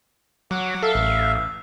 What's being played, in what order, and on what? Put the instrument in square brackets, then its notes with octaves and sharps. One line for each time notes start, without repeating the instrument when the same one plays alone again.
[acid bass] F#3 [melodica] F#5 D6
[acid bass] A4 [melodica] E5 F5
[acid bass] A1